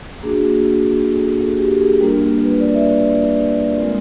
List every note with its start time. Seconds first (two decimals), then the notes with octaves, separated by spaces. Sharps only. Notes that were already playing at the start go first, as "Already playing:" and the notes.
0.22 A#3 D4 F#4 G#4
1.12 A4
1.41 A4
1.57 G4
1.73 G4
1.78 G#4
2.01 G3 A#3 D4 F4 A#4
2.45 B4
2.60 D5
2.74 E5
3.78 G#3 C4 F4 A#4